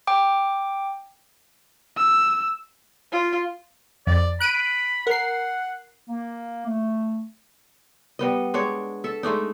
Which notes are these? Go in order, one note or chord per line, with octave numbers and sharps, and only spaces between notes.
G5 D6
E6
F4
F2 D5
B5 F#6 D7 D#7
A#4 F#5 C7
A#3
A3
G3 B3 D#5
G#3 D4 C#5
A4 E5
G#3 A3 D4 D#4